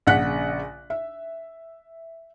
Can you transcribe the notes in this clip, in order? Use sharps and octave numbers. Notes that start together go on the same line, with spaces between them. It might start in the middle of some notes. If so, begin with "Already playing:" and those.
A#1 C#3 F#5 F#6 B6
E5